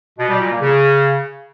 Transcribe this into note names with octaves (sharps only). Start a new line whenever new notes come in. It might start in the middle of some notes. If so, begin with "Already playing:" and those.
B2
G3
A#2
A#3
C#3